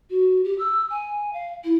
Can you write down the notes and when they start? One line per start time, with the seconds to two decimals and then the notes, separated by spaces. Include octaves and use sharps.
0.10 F#4
0.44 G4
0.58 E6
0.90 G#5
1.33 F5
1.64 E4